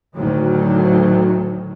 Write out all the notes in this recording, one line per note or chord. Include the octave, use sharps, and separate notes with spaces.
D2 A2 D#3 F#3